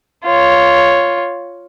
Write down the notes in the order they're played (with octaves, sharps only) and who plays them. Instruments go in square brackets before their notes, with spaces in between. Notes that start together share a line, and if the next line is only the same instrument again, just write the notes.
[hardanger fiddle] F4 C#5